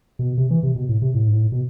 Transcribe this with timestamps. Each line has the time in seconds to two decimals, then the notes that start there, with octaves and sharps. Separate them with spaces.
0.19 B2
0.38 C3
0.51 E3
0.63 C3
0.76 B2
0.89 A2
1.02 C3
1.14 A2
1.27 G#2
1.33 A2
1.52 B2